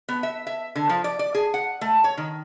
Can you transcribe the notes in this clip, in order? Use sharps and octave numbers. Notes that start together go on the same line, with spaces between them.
B3
E5
E5
D3
F3
D5
D5
G#4
F#5
A3
C#5
D#3